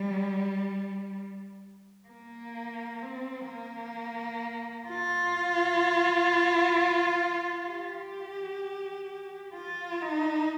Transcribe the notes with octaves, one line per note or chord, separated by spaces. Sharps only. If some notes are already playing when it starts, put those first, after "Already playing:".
Already playing: G3
A#3
C4
A#3
F4
G4
F4
D#4